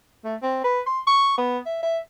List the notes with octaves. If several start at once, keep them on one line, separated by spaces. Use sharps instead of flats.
A3
C4
B4
C6
C#6
B3
E5
E5